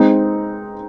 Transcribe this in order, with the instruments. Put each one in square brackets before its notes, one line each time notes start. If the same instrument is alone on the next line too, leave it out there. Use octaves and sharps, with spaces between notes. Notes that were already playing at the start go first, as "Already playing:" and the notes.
Already playing: [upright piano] G#3 C4 D#4